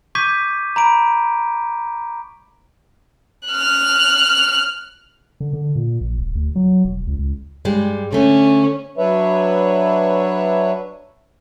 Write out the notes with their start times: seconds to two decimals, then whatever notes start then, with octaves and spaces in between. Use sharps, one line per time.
0.15 C#6 D6 G6 G#6 B6 D#7
0.76 A#5 B5 D7
3.48 F6 F#6
5.40 D3
5.53 D3
5.75 A#2
6.01 A#1
6.18 D#1
6.35 D2
6.55 F#3
6.85 E1
7.07 C#2
7.19 C#2
7.65 G2 G3 G#3
8.13 D3 A3 C#4
8.97 F#3 D4 B4 C#5 E5